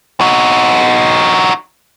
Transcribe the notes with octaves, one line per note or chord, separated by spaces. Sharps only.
D#4 F#4